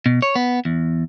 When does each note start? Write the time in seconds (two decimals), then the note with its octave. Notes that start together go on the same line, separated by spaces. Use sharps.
0.06 B2
0.22 C#5
0.36 B3
0.65 E2